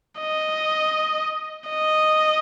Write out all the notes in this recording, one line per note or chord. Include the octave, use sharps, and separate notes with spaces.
D#5
D#5